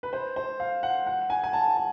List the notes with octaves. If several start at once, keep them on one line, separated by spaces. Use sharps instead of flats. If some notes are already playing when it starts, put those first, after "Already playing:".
B4
C5
C5
F5
F#5
F#5
G#5
G#5
A5
A5